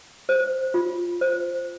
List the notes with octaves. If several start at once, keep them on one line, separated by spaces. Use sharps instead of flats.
C5
F4
C5